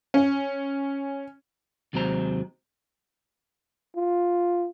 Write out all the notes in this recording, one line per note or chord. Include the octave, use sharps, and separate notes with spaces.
C#4
D#2 C3 F#3 G#3 C5 A#5
F4